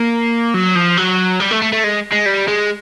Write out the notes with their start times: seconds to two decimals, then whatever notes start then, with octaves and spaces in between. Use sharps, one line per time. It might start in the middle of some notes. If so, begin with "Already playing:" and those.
Already playing: A#3
0.54 F#3
0.76 F3
0.98 F#3
1.40 G3
1.51 A3
1.62 A3
1.72 A3
1.84 G#3
2.12 G#3
2.26 G3
2.48 G#3